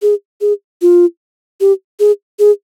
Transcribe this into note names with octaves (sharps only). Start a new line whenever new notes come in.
G#4
G#4
F4
G4
G#4
G#4